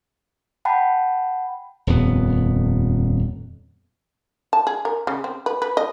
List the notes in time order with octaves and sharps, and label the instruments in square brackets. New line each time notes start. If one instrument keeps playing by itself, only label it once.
[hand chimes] F#5 G5 A5 B5
[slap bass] D#1 F2 B3
[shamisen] A5
G#4
A#4
C#3
C4
B4
B4
D#5